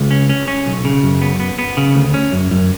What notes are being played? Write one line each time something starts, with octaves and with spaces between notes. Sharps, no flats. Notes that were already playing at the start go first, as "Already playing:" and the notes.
Already playing: C#2
C#4
C#4
C#4
B1
C#3
F#2
B3
B3
B3
C#3
D2
C#4
F#2
F#2